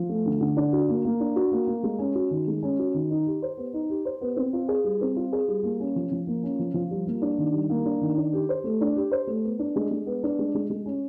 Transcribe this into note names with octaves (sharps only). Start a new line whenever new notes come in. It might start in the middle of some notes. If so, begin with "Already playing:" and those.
Already playing: F3
A3
D3
D3
D4
F#4
A#3
A#3
D4
F#4
A#3
A#3
G#3
C#4
F#4
D#3
G#3
C#4
F#4
D#3
D#4
G4
C5
B3
D#4
G4
C5
B3
C4
F4
G#4
G3
C4
F4
G#4
G3
A#3
C#4
F3
F3
A#3
C#4
F3
F3
G3
A#3
D4
D#3
G3
A#3
D4
D#3
D4
G4
C5
A3
D4
G4
C5
A3
B3
D4
G#3
G#3
B3
D4
G#3
G#3
G#3
C#4